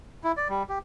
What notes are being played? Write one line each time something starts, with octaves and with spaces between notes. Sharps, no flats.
E4
D5
G3
G4